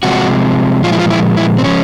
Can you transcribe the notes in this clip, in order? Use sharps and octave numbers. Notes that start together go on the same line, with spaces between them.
C3 F3 G#3 F#4
A#2 F3 G#3 F4
E4
F4
E4
E4
C4
F3 G#3 C#4